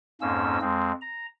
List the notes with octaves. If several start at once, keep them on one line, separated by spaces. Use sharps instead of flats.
F2 G#2 A#3 C#4 E6
F2 G#3 C4
A#5